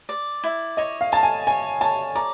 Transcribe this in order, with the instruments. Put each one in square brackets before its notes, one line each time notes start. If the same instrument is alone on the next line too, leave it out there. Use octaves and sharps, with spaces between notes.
[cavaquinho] D5
E4
[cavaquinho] C#5 [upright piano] D#5
[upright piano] F5
[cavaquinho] C#5 [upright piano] A5
[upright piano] G#5
[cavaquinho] C#5 [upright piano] G#5
[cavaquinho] C#5 [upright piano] A5
[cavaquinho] D5 [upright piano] A#5